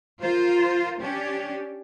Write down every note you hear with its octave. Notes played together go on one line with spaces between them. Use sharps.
F4 A#4 C5
C#4 D4 G4